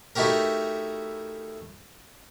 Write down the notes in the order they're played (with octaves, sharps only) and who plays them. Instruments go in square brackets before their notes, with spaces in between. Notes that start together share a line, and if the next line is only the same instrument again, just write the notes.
[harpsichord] A3 D#4 E4 F#4 G4 A#4